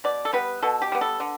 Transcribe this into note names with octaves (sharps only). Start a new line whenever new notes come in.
B2 D5
A4
G3 B3 B4
B2 A4
G4
G3 B3
A4
D3